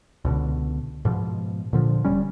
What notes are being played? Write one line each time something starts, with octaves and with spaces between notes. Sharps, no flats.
C#2 B2 D3
G#2 B2 F3
A#2 D3 F3
E1 G3 C#4